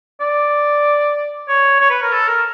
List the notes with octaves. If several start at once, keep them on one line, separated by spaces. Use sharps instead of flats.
D5
C#5
C#5
B4
A#4
A4
A#4